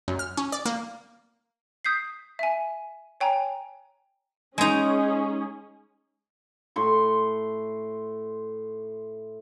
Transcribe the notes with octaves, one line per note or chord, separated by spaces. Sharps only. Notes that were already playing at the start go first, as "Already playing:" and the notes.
F#2
F6
C#4
D5
A#3
D#6 G6 B6 C7
E5 G#5
C#5 G5 G#5 A#5
G#3 C#4 D#4 G#4
A2 C6 C#6